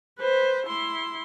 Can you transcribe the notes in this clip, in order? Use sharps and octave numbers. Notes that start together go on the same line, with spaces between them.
B4 C5
E4 C6